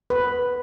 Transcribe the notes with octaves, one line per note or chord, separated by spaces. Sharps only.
B4